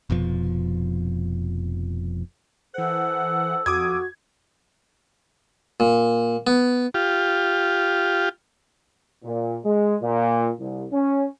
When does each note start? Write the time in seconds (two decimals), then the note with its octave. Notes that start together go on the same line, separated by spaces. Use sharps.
0.10 F1 F2 B2 F3
2.74 E3 A4 C5 F#5
3.66 F2 F#4 D6 D#6 G#6
5.80 A#2
6.47 B3
6.94 F4 G4
9.23 A#2
9.65 G#3
10.01 A#2
10.59 C2
10.92 C#4